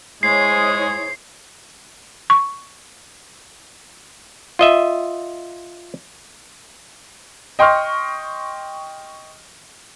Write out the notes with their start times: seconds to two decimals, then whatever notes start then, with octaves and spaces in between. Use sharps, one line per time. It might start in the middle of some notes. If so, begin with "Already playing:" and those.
0.23 G#3 E4 G#4 C5 C#5 C7
2.30 C#6
4.59 F4 D#5 E5
7.59 D#5 G5 C6 C#6 F6